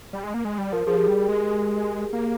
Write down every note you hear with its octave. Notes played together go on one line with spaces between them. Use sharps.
G3
G#3
A#3
G#3
G3
F3 A#4
F3 G#4
G4
G#4
G3
G#3
A#3